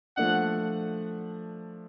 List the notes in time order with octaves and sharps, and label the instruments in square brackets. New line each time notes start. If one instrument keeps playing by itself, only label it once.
[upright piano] F3 A3 D4 [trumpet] F#5